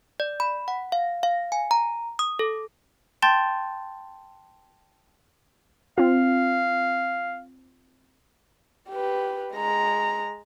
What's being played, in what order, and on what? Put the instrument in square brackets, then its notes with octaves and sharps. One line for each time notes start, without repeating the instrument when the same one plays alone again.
[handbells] D5
B5
F#5
F5
F5
G#5
A#5
D#6
A4
[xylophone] G5 A5 C6 G6 A6
[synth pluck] C4 F4 [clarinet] F5
[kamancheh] G4 B4
G#3 A#5